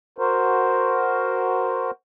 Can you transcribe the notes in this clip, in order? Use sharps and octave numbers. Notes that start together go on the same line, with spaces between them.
F#4 A#4 C5